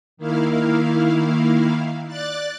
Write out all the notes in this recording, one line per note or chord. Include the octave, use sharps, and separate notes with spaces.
D#3 A#3 E4 F5
D5 F#6 A6